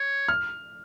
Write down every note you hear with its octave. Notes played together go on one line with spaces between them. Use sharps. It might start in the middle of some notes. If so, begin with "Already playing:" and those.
Already playing: C#5
F6